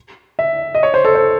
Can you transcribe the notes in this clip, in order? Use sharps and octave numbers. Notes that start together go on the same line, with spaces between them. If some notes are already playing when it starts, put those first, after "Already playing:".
E5
D#5
C#5
C5
A4
C5